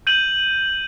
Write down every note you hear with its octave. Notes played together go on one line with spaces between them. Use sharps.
G6 D#7 F#7